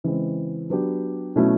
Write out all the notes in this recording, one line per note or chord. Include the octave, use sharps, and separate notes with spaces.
C#3 E3 G#3 C4
F#3 B3 D4 G4
B2 F#3 A3 C#4 E4